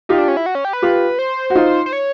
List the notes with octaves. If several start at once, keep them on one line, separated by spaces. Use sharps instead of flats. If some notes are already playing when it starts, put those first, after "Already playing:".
D#4 F4 G4
D4
C#4
E4
F#4
C#4
G4
B4
F4 G4
C5
F#4
D#4 F4
C5
C#5